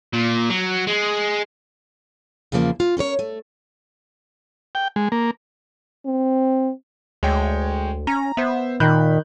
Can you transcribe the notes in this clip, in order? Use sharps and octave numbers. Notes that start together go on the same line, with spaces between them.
A#2
F#3
G#3
E2 A#2 C#3 F3 A#3
F4
C#4 A#4 B4 C#5
A3
G5
G#3
A#3
C4
D2 G#3 C#5 G5
C#4 A#5
B3 C5 E5
A#2 D#3 B5 F#6 G6